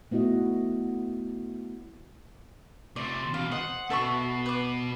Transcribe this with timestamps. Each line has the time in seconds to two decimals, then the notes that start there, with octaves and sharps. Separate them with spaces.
0.11 A3 B3 E4 F#4 D#5
2.96 C3 A3 D5
3.34 E2 B2 F5
3.52 C5 D#5 F#5
3.90 B2 B3 A4 E5 C#6
4.46 B4 D6